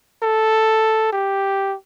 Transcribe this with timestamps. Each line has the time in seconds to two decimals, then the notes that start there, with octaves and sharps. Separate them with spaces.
0.23 A4
1.12 G4